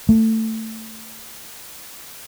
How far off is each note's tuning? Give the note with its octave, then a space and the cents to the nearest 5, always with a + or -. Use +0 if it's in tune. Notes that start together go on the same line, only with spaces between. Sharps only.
A3 +15